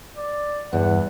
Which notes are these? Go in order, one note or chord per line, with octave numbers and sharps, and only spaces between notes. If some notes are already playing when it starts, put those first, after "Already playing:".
D5
E2 G2 F#5